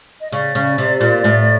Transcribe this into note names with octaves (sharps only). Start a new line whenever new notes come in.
D#5
C#3 D5
C#3
C3
A#2
A2